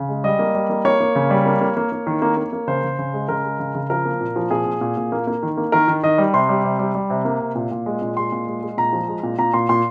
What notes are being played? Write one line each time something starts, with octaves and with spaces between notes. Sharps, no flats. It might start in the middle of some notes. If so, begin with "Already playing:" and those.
Already playing: C#3
G#3
G3 D#5
A#3
G3
A#3
A#3 C#5
A#3
C#3
G3
A#3
A#3
A#3
A#3
D#3
A#3
A#3
A#3
C#3 C5
C#3
C#3
G#3
C#3 A#4
G#3
C#3
C#3
F3 A#4
A#3
A#2
F3
A#2 G#4
A#2
A#2
A#2
A#3
A#3
D#3
A#3
D#3 A#4
D#3
D#3 D#5
G3
C3 C6
G3
C3
G3
G3
C3
A#3
C3
A#2
A#2
G#3
A#2
G#3 C6
A#2
G#3
G#3
A#2 A#5
F3
G#3
A#2
A#2 A#5
A#2 C6
A#2 C6